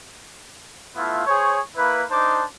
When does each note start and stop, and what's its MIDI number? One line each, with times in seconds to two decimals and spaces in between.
0.96 1.25 57
0.96 1.25 59
0.96 1.25 64
0.96 1.25 65
1.26 1.58 68
1.26 1.58 72
1.26 1.58 73
1.76 2.03 58
1.76 2.03 64
1.76 2.03 71
2.11 2.44 62
2.11 2.44 63
2.11 2.44 72
2.11 2.44 81
2.11 2.44 86